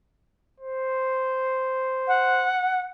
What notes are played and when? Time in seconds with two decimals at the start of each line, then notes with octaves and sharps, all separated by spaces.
0.60 C5
2.08 F#5